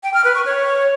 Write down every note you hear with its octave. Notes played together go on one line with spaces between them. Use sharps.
G5
F6
B4
C#6
C#5